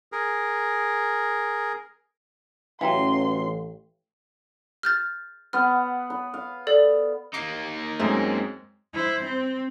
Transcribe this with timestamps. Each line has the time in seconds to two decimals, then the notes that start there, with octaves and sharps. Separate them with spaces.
0.12 G#4 A#4
2.81 A1 E3 F#3 F5 G5 A#5 C6
4.83 F6 G6 A6
5.53 B3 F#5 F6
6.10 B5
6.34 F5
6.67 A4 D5
7.34 A#3 D#4 D6 C7
8.00 F#2 G#3 A3 C4
8.94 E4 C5
9.24 C4